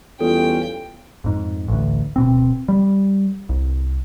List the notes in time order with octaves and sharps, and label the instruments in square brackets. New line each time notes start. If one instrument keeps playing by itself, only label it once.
[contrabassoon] E2 [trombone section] G3 C#4 F4 [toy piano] A4 [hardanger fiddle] G5
[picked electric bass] F2 G#2
A1 D2
D1 B2 C4
G3
C2